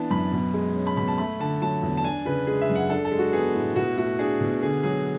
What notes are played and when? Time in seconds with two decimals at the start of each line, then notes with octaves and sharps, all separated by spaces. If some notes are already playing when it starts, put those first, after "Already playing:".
Already playing: E3 B3 D4 A5
0.11 F#2 B5
0.33 B2
0.54 G#3
0.76 C#4
0.87 B5
0.97 B2 B5
1.08 A5
1.18 A3 B5
1.40 D3 A5
1.62 F#3 A5
1.83 E2
1.97 A5
2.04 D4 G#5
2.25 C#3 B4
2.47 G#3 G#4
2.61 E5
2.69 F#2
2.75 F#5
2.90 D4 A4
3.05 A4
3.12 G#3
3.19 F#4
3.33 B3 G#4
3.55 A2
3.76 B2 F#4
3.97 A3 F#4
4.19 D4 G#4
4.41 B2
4.62 D3 G#4
4.83 F#3 G#4